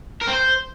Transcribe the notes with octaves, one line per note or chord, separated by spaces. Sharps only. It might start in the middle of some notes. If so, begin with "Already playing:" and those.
A#4
C4
C5